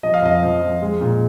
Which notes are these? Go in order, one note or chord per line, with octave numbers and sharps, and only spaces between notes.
F3 D#5
F5
F2 D#5
F3
F3
G#3
A#2